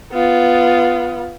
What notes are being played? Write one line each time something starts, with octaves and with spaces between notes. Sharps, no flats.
B3 F4